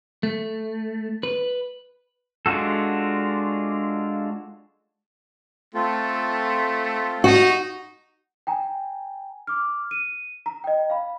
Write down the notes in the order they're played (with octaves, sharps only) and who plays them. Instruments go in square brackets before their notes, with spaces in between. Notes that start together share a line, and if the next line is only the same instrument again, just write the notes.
[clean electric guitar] A3
B4
[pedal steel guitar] G#3 D4 F4 F#4 A4
[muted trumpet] A3 [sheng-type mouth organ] C4 F4 A4
[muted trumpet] D#4 [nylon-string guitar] F#4
[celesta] G5 G#5 A#5
D6 F6
D#7
A#5
D#5 G5
F5 B5